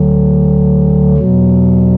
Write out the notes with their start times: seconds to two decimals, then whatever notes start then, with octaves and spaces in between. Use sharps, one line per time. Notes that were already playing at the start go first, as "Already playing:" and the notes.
Already playing: D2 D3 F#3
1.17 E2 B2 F#3